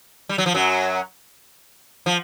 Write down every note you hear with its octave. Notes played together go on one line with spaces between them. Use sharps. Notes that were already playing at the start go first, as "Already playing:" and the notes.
G3
F#3
F3
F#2 F#3
F3